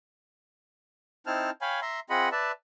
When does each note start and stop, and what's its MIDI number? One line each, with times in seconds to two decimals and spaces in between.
1.26 1.50 60
1.26 1.50 63
1.26 1.50 64
1.26 1.50 72
1.26 1.50 81
1.26 1.50 89
1.61 1.80 73
1.61 1.80 77
1.61 1.80 79
1.61 1.80 80
1.61 1.80 83
1.82 2.00 76
1.82 2.00 82
1.82 2.00 84
2.10 2.29 60
2.10 2.29 65
2.10 2.29 68
2.10 2.29 75
2.10 2.29 78
2.10 2.29 83
2.32 2.52 71
2.32 2.52 74
2.32 2.52 76
2.32 2.52 81